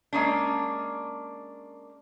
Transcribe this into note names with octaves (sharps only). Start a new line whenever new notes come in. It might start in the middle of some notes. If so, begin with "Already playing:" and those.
G#3 A#3 C#4 D4